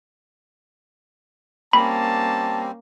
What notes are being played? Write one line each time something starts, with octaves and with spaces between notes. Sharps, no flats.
G3 A#3 C4 C#4 A5 B5